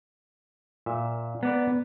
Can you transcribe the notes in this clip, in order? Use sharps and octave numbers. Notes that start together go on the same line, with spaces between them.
A#2 E5
B3 B4 D5 A#5